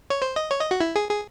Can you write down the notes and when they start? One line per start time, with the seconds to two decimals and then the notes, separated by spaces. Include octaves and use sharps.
0.10 C#5
0.22 C5
0.36 D#5
0.51 C#5
0.61 D#5
0.71 F#4
0.80 E4
0.96 G#4
1.09 G#4